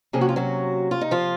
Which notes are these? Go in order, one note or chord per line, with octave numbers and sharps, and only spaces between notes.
C3 F3 A#3 C#4 G#4
F#4
F4
F#3 F#4
F4
D#4
F3 F4